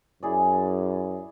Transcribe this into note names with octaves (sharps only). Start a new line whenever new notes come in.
F#2 E4 G#4 D5